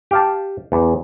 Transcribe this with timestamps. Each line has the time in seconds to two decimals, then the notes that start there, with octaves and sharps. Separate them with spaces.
0.11 G4 F5 A5
0.72 E2